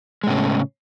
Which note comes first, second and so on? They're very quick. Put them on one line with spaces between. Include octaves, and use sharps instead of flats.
G#3 A2 C#3